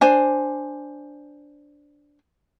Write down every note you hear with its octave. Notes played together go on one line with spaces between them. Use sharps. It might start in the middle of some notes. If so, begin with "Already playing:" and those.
D4 C5 G#5